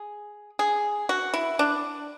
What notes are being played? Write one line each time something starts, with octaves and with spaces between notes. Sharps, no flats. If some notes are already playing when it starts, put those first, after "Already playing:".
Already playing: G#4
G#4
F#4
E4
D4